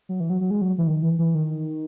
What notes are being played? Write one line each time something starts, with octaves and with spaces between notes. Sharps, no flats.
F#3
E3
F#3
F#3
G#3
F#3
E3
D#3
E3
E3
D#3